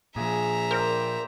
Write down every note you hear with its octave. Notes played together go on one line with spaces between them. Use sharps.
A#2 F3 G#4 E5 A#5
A#4 C5 D5 G5